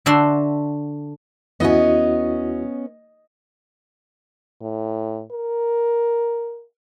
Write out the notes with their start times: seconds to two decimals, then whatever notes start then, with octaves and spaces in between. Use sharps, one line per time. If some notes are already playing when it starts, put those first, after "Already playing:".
0.06 D3 D4 F#4 E5 C6
1.60 D#2 B3 C#4 E4 F#4 D#5
4.61 A2
5.31 A#4